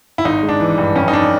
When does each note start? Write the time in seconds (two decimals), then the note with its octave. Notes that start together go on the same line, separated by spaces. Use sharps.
0.18 E4
0.25 G#1 D#4
0.43 G#3
0.49 D4
0.60 E3
0.78 G2
0.96 F2 C#4
1.08 D#4
1.12 F2 D4